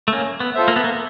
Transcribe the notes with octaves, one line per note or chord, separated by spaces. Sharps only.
A3
A#3 C#4
B3
F4 A4 C5 E5
A#3
B3
A#3